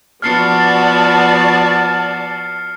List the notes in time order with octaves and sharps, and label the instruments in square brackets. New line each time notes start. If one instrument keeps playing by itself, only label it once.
[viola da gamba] F3 B3 F#4 [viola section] D5 A5 [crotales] F6 C7 C#7